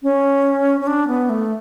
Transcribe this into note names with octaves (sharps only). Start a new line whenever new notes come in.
C#4
C#4
D4
B3
A3